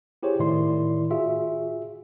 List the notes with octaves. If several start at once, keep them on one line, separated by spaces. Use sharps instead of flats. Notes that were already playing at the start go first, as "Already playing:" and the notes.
E4 G4 G#4 C5 C#5
A2 D#3 E4 D5 C6
F4 F#4 G#4 E5